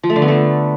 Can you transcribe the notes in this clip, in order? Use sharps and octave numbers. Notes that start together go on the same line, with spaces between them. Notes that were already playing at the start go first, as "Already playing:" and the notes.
F3
A3
D3
B3
A3